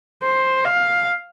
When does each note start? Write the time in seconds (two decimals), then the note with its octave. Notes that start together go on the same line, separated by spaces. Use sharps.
0.23 C5
0.64 F5